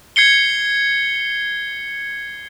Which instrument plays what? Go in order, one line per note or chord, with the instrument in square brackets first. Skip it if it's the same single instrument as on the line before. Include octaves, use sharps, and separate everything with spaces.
[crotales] G#6 C7 C#7 G7